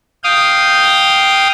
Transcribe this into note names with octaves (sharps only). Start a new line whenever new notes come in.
F5 G5 D#6